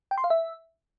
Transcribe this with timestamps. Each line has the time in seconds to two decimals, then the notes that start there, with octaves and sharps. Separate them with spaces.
0.11 G5
0.18 C6
0.24 F5
0.30 E5